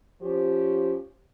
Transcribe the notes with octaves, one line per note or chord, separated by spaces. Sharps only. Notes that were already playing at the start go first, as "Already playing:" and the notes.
F3 C#4 G4 C5